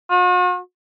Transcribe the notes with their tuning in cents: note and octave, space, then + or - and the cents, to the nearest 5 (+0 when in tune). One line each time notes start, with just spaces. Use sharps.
F#4 -45